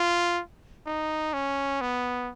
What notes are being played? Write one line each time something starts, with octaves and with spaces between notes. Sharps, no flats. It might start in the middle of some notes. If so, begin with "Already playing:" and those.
Already playing: F4
D#4
C#4
B3